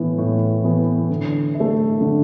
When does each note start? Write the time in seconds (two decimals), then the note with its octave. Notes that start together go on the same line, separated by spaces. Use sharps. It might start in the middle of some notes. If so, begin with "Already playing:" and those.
Already playing: A2 E3 B3
0.18 A2
0.64 E3 B3
1.10 D3
1.54 E4
1.60 A3
2.01 D3